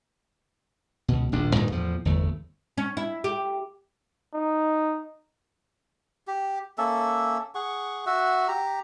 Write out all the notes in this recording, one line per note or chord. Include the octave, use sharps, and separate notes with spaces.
C#2 B2
D#1 A#1 D4
D2 G2 A#2 D#3
E2 A2 F3
G1 E2 A3
C#4
E4
G4
D#4
G4
A#3 C#4 A4 E5
G#4 F#5 C#6
F#4 E5 F#5
G4 A#5